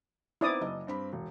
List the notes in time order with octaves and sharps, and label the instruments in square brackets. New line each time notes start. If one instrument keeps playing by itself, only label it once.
[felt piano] B3 C4 D#4 [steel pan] E4 D5 D#6
[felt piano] F#1 D#5
G2 C4 B5
E1